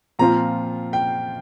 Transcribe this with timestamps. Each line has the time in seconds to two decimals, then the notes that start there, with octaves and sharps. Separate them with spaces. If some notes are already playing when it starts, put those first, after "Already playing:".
0.19 A#2 F3 C4 F4 A#5
0.93 G5